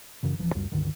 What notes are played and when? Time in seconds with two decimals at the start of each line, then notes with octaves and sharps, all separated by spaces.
0.23 F#2 C#3 E3
0.38 D#1 E3 F3
0.55 C#2 F#2 G3
0.72 C#2 G2 D3 D#3